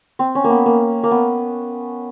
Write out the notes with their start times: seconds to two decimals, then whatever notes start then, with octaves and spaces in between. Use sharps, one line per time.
0.19 C4
0.35 C#4
0.44 A#3
0.50 B3
0.66 A#3
1.03 A#3
1.11 B3